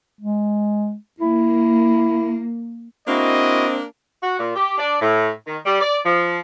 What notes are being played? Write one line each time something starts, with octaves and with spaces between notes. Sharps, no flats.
G#3
A#3 E4
A#3 C4 D4 E4 F#4 D#5
F#4
A#2
G4
D4
A2
D#3
G3
D5
F3